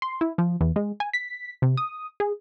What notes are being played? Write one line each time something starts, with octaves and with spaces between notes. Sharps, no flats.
C6
E4
F3
E2
G#3
G#5
B6
C3
D#6
G#4